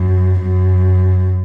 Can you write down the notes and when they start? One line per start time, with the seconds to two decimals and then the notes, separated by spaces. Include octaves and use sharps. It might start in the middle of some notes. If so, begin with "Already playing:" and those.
Already playing: F#2
0.41 F#2